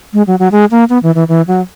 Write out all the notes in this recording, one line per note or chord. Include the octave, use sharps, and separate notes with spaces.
G#3
F#3
F#3
G#3
A#3
B3
E3
E3
E3
F#3